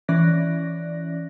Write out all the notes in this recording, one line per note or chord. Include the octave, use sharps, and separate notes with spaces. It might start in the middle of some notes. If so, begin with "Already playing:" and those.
E3 C#4 D5 F#6 A#6